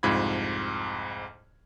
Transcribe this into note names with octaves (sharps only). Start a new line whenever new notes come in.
C2 F2 G#2 F4 B5 G#6